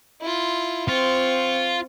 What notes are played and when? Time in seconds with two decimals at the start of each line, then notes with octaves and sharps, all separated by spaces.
0.21 E4 F4
0.88 C4 F4 C#6